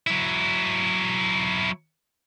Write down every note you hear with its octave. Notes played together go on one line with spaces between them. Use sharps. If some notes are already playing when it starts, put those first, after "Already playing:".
F#3 E4